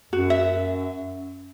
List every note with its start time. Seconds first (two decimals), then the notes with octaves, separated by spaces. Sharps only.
0.13 F#2 F#4
0.30 E5